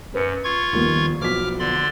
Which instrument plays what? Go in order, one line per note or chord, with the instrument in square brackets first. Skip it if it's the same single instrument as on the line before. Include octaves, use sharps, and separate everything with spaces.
[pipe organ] F#2 [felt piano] B4 C#7
[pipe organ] F4 C#6 G#6
[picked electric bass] D#2 D#3 G3 [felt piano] F3 A#3 B3
[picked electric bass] B1 F3 [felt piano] B3 F#4 B6 [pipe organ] D6 F6
[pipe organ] D3 D5 C6